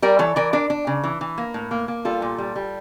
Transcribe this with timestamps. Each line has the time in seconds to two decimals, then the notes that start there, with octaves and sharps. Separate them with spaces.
0.02 G3 A#4 D5
0.19 E3 A4 C#5
0.36 E3 A#4 D5
0.53 D4 A#4 D5
0.70 D4
0.87 C#3
1.04 E3
1.21 E3
1.38 A#3
1.54 A2
1.71 A#3
1.88 A#3
2.05 G3 F4 A4
2.22 A#2
2.38 G3
2.56 G3